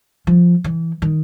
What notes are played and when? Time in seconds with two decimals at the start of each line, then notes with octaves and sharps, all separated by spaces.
0.27 F3
0.64 E3
1.02 D#3